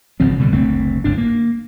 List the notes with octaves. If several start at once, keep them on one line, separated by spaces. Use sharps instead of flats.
G#1 C#3 F3 C4
B2 D3 G3
F#1 D2 A3 C4
G1 G#2 D4
A#3